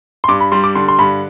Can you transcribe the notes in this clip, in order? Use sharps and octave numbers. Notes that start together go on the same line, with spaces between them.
C6
G2 D6
B5
G3 C6
D6
D3 C6
C6
G2 B5